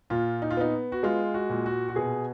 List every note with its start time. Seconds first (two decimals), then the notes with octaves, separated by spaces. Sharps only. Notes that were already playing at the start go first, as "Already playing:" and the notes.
0.10 A#2 F4
0.42 D#4
0.51 F4
0.57 B3 D#4
0.92 F#4
1.03 G#3 F4
1.34 F#4
1.50 A#2
1.66 F#4
1.89 F#4
1.96 B2 G#4